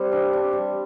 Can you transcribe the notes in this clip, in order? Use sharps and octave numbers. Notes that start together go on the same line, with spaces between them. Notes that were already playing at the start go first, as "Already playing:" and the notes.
Already playing: G3 C4
D4
D4
G3